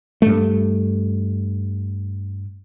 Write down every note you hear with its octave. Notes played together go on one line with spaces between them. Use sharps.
G2 A3